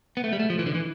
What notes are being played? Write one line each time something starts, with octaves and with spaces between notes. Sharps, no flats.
B3
A3
G3
A3
F3
E3
D3
E3